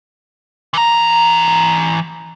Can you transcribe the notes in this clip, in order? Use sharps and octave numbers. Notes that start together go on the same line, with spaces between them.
E3 A#5